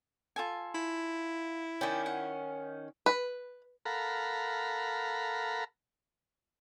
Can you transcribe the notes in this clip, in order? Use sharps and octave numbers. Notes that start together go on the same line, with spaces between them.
F4 A4 G#5
E4
D#3 C#4 D5 G5
F#5
B4
A4 A#4 F5 F#5 A#5 B5